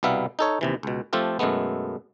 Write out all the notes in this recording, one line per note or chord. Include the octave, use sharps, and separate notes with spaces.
C2 B2 G3 B3 E5 F5
D#4 A4 C#5
D#2 C3 E3
C#2 B2
F3 A3 C4 F4 G4 A4
F#2 B2 G#3 A3 B3